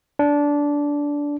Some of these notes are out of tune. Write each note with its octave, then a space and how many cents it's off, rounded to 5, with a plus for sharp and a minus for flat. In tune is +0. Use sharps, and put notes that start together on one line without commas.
D4 -15